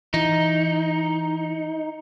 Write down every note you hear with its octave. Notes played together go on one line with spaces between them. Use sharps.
E3 D#4